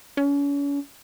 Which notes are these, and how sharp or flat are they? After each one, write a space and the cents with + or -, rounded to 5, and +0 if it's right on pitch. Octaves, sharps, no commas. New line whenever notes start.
C#4 +40